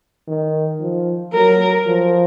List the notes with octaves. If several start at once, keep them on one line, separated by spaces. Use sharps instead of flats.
D#3
F3
F#3 A#4
F3